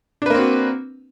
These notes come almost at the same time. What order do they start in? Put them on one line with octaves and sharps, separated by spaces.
D4 B4 A#3 C4 F#4